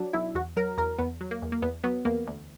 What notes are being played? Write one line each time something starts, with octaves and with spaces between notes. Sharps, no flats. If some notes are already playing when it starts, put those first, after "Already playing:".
Already playing: F#3 D4
B1 E4
E2 F#4
F#3 A#4
E2 A#4
E2 B3
F#3
A#3
E2
A#3
E2 B3
F#3 B3
E2 A#3
D2